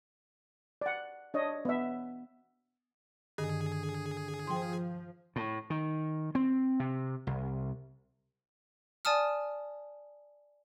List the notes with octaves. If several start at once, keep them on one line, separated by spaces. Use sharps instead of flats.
D5 F#5
D4 C#5 D#5
B3 E5
G2 D3 D#3 G#4
F3 G5 C6
A2
D#3
C4
C3
C2
D5 G#5 A5 D#6 F6